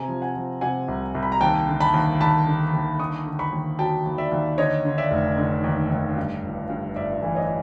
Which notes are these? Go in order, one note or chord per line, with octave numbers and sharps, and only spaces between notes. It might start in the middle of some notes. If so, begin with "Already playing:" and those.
Already playing: C3 G#5 A#5
F3
F#5 G#5
F3
C3 F#5 G#5
C2
C2
B5
A#5
D#2 G5 A5
D3
A5 B5
D#2
D#2 A5 B5
D3
D#2
D3 C#6 D#6
D3
B5 C#6
D#2
F#3 G5 A5
D#2
D5 E5
D#2
D3 C#5 D#5
D3
D5 E5
F1
D3
D#2
D#2
G2
G1
G2
G1 D5 E5
E3
C#5 D#5